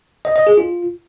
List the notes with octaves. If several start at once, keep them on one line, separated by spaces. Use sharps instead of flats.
D#5
D#5
G#4
F4